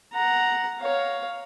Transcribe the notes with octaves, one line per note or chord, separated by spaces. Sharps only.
F#5 A#5
C#5 F5